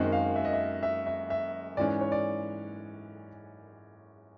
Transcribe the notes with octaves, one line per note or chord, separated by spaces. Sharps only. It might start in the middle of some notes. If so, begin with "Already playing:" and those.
Already playing: F#2 D#3 G#3 C4
F5
E5
D#5
E5
E5
E5
E5
G#2 E3 G#3 C#4 D5
C#5
D5